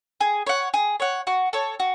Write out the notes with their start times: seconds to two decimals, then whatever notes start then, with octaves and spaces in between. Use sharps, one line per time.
0.21 G#4
0.47 C#5 F#5
0.74 G#4
1.00 C#5 F#5
1.27 F#4
1.53 A4 C#5
1.80 F#4